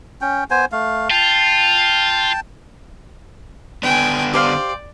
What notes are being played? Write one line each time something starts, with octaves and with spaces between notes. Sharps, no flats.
C#4 G5
B3 C5 G#5
A3 F5
F4 G5 A5
D3 B3 D4 G5 G#5
G4 C5 D5 F5